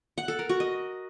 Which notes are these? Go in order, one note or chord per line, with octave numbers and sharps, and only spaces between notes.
F#5
A4
A#4
F#4
D#5